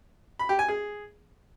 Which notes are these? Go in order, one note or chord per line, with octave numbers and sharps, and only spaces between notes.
B5
G4
G#5
G#4